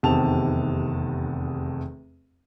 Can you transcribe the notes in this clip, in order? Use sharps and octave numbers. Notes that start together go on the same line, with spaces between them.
F1 E2 C3 D#3 A5 F7